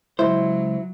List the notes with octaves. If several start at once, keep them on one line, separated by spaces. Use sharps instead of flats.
C#2 F#3 E4 C5